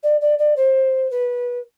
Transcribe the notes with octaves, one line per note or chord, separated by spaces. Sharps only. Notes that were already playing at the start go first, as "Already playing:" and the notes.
D5
D5
D5
C5
B4